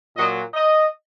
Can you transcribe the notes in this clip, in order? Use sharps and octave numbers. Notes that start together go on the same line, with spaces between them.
A#2 F#3 D#5
D#5